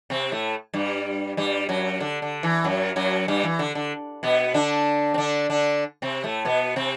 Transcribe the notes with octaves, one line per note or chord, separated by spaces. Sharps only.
C3 C4
A2 A3
G2 G3
G2 G3
F#2 F#3
D3
D3
E3
F#2 F#3
F#2 F#3
G2 G3
E3
D3
D3
B2 B3
D3 D4
C4
D3 D4
D3 D4
C3 C4
A2 A3
B2 B3
C3 C4